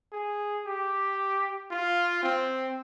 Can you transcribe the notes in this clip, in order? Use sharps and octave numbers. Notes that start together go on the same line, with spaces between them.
G#4
G4
F4
C4